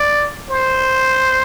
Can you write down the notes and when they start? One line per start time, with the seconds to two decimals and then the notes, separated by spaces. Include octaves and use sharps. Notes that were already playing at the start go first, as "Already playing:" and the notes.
Already playing: D5
0.50 C5